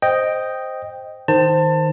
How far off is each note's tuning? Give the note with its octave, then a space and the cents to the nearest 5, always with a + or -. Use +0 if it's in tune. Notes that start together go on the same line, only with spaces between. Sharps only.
C5 +0 D#5 +0 G5 +0
D#3 +0 C5 -5 A5 +25